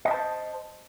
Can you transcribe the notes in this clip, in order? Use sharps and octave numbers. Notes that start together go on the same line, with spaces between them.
C5 D#5 E5 A5